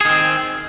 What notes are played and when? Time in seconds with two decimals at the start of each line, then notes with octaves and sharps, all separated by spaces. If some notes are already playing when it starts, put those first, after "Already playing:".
0.01 G#4
0.05 D#3
0.10 C4